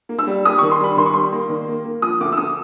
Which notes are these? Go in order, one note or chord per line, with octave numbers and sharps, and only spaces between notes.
A#3
E6
G3
G3 D#6
D#3 C#6
C6
G3 B5
D#3 C6
C#6
G3 C6
A#3
D#3
A#3
A#3
F3 D#6
D2 D6
E6
D2 D#6